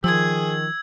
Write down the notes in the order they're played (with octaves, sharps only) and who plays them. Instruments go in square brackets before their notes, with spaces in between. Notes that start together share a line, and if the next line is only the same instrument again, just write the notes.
[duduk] D#3 [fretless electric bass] F3 [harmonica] G#4 [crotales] E6 G#6